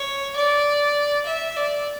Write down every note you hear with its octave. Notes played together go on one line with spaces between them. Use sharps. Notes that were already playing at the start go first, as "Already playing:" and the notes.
Already playing: C#5
D5
E5
D5